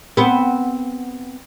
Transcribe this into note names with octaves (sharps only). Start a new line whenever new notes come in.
B3 C4